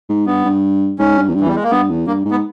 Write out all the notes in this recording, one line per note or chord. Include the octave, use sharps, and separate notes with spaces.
G#2
G2 B3
G2
G#2 C#4
G2
E2
G2
E3
E2 G3
G#3
A#3
G2 B3
E2
G2 A#3
G#2
B3